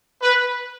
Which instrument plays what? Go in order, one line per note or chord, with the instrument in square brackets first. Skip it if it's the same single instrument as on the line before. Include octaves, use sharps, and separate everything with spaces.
[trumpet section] B4